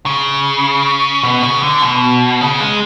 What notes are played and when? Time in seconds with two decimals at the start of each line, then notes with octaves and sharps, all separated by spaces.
0.06 C#3
1.23 B2
1.42 C#3
1.63 D3
1.82 B2
2.41 C#3
2.60 G#3